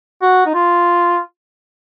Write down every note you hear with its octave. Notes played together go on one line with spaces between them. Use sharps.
F#4
D#4
F4